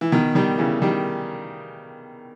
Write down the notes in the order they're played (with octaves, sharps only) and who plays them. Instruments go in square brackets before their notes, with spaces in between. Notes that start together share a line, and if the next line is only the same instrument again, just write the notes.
[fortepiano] E3
B2 D#3
D#3 G3
C#3 E3
D#3 G3